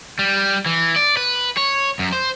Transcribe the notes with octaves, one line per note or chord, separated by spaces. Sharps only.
G3
E3
D5
B4
C#5
F#2
C5